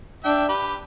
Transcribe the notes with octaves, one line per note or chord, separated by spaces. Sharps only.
D4 E5 G5
G4 B4